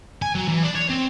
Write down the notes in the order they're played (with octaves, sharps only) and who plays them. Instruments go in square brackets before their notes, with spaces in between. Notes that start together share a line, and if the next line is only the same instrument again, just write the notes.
[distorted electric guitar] G#5
F#3
E3
D4
C#5
C4